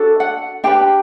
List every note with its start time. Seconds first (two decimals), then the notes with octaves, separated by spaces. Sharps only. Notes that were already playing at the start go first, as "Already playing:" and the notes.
Already playing: D4 F#4 A4
0.20 F#5
0.64 D4 G4 B4 G5